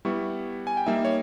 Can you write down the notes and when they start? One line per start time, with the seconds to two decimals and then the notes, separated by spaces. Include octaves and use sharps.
0.05 G3 B3 E4 C#6
0.67 G#5
0.77 G5
0.86 G3 A#3 D#4 E5
1.05 C#5